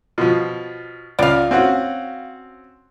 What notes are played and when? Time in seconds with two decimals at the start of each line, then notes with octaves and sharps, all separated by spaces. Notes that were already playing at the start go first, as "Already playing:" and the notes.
0.18 B2 F3
1.19 C#2 D5 F5
1.51 C4 C#4 F#4